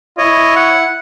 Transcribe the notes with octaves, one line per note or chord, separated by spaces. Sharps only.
E4 C#5 D#5
F#5